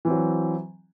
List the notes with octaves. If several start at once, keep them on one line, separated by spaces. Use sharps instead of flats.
E3 F#3 C4